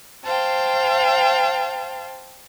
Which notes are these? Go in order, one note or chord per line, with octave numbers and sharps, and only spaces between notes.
C5 F5 G5 A5